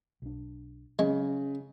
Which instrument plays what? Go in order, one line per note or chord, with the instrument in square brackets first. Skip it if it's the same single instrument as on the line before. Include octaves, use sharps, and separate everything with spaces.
[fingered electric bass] B1 D4
[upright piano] C#3 [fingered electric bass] F#3 [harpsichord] G#3